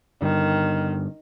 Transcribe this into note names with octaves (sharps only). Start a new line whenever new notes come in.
G2 D3 D#3